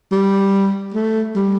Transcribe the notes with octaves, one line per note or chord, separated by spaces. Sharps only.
G3
A3
G3